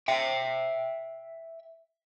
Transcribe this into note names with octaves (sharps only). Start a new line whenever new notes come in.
E5 G5